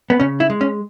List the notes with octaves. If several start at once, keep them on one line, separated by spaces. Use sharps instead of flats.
B3
C#3 C#4
E4
G#3
C#4